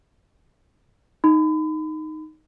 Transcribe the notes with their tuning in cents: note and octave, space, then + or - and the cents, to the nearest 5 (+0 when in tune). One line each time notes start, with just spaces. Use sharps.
D#4 +0 B5 +35